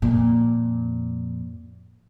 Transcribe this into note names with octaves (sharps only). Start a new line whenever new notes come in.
F2 A#2